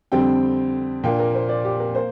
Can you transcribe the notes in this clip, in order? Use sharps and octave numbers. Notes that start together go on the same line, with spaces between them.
F2 D3 G3 C4 G5
A#2 A#3 D4 G5
A#4
C5
D5
G4
A#4
A#3 C5